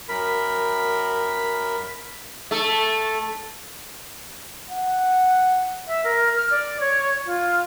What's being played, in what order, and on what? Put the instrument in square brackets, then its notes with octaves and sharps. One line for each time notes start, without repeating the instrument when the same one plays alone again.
[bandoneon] F#2 A#4 B5
[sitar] A3 A4
[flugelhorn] F#5
[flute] E5
A#4
F6
D5
C#5
F4